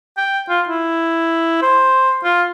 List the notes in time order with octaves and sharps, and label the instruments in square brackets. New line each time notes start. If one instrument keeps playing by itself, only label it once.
[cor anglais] G5
F4
E4
C5
F4